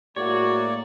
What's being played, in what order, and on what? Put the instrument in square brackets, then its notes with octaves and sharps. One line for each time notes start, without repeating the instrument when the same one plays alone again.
[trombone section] A2 G#3 A#3 [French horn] F#4 [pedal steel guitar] C#5 [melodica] D5